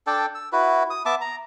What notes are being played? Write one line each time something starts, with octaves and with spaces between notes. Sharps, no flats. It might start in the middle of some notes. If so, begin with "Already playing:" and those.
D4 A4 D5 G5
E6
E4 F#4 B4
D#6
B3 E5 A5 D6
A#5